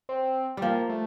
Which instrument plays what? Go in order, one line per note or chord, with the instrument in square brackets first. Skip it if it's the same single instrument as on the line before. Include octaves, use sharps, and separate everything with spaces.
[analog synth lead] C4
[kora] F3 G3 [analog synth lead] A#3
[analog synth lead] A3